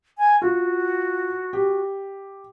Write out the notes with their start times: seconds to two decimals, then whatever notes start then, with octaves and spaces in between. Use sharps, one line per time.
0.18 G#5
0.42 F4 F#4
1.53 G4